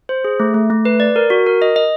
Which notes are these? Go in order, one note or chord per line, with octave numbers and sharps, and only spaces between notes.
C5
G#4
A3
A3
A3
B4
D5
A#4
F#4
A#4
D#5
D#5